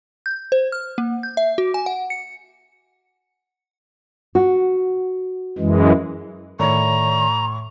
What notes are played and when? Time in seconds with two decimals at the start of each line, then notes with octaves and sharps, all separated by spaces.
0.26 G6
0.52 C5
0.72 F6
0.98 A#3
1.23 G6
1.37 E5
1.58 F#4
1.74 G#5
1.86 F#5
2.10 C#7
4.35 F#4
5.58 F#2 E3 G#3
6.59 A2 D#3 C#5 D5 A#5 C#6